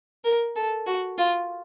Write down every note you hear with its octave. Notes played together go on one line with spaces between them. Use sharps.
A#4
A4
F#4
F4